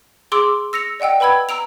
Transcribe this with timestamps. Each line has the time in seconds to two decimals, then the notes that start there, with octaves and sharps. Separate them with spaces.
0.32 G#4 C6 D6 E6 D7
0.73 E6 A#6 C#7 F7
1.00 D5 D#5 F#5 G5 E6
1.20 B4 G5 B5 E6 G#6
1.49 A#5 E6 D7 F7